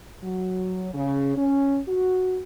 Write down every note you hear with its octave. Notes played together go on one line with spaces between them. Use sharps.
F#3
C#3
C#4
F#4